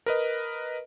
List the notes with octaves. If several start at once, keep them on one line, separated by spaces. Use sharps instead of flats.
A#4 B4 D#5